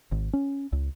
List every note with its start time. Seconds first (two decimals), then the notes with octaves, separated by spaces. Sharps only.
0.12 G#1
0.33 C#4
0.73 C#2